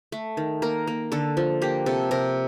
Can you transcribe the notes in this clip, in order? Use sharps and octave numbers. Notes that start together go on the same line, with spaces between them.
A3
D#3
A#3 A#4
A#3
D3 A4
F3
A#3 G4
C3 A4
C3 A#4